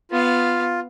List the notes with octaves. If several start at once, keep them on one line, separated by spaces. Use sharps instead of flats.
B3 F4 F5